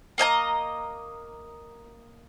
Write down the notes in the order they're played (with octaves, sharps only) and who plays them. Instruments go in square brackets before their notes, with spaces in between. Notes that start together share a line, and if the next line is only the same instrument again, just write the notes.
[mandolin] A#3 D#5 G#5 A#5